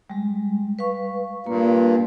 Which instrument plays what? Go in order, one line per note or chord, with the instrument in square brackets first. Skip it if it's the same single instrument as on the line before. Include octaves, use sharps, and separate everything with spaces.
[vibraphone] G3 G#3
B4 F5 C#6
[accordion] G2 A#2 [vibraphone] A#3